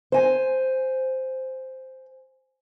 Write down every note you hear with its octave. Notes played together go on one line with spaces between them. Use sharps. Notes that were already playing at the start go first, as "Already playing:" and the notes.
C5 G#5